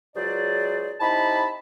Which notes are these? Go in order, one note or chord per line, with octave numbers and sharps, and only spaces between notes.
C#2 F#3 G#4 C5 D5
C3 D#4 E4 A5 B5